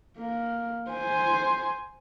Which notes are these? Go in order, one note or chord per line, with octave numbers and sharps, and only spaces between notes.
A#3
C5 G#5